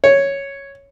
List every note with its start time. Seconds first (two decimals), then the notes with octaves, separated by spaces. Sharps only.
0.04 C#5